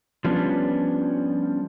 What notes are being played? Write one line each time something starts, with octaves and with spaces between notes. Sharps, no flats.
F3 G3 B3 C#4 D4